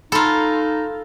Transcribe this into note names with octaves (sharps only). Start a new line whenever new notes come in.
D#4 F4 A4 A#5 B5